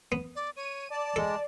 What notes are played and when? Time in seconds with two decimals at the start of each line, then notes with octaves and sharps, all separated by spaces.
0.12 B3
0.35 D5
0.56 C#5 D#7
0.90 D5 A5
1.16 G#3 A4